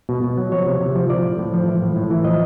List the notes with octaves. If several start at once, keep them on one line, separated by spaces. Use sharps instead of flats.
B2
B2
F#3
F3 C#5
C3
C3
F3
F3 D5
A2
A2
F3
E3
A2
A2
E3
F3 D#5